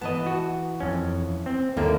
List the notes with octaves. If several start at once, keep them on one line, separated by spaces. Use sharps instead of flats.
E3 B3 D#5 A5
F#4
F2 C#4
C4
D#2 D3 A#3 D4 E4